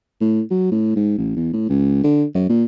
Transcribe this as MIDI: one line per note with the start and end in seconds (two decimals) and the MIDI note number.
0.21 0.42 45
0.51 0.71 54
0.72 0.93 45
0.96 1.13 44
1.18 1.34 33
1.36 1.52 40
1.53 1.65 45
1.69 2.01 37
2.04 2.25 50
2.35 2.49 42
2.50 2.65 46